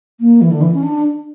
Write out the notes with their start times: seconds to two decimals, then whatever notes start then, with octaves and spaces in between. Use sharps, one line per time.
0.20 A#3
0.42 E3
0.51 D3
0.61 E3
0.74 C#4
0.83 D4